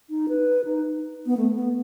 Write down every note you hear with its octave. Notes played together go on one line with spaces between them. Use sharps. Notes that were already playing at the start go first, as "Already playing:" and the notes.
D#4
B4
D#4
B3
A3
B3